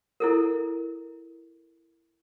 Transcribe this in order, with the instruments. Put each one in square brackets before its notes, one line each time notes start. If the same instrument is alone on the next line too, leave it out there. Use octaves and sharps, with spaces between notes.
[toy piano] E4 A4 A#4